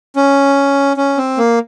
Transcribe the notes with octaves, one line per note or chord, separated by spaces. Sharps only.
C#4
C#4
C4
A#3